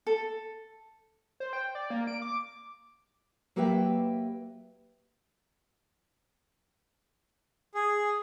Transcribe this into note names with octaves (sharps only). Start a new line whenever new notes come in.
A4
C5
G5
D5
A#3
D7
D6
F#3 A#3 G4 B4 E5 G5
G#4